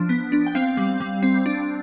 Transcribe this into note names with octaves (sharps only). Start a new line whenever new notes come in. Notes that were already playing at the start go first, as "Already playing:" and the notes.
Already playing: F3 D4
B3
D4
G5
C4 F5
G3
G3
C4
D4